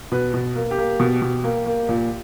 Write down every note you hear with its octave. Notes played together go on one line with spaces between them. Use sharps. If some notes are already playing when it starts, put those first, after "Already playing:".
B2 B4
B2
A#3
G4
A#3
B2
B2
A#3
A#3
A#2